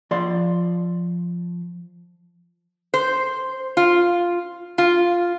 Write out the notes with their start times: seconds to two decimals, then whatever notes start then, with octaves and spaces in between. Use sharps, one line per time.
0.11 F3 D5 C6
2.94 C5
3.77 F4
4.78 F4